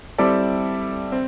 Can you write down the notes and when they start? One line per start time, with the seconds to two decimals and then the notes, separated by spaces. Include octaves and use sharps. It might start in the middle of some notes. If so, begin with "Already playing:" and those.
0.18 G3 C4 E4 A4 D5
1.12 C4